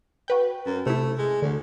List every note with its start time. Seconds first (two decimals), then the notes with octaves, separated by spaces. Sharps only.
0.28 F#4 B4 G5
0.66 F#2
0.86 C3 A3 E4
1.18 G#3
1.42 D2 D3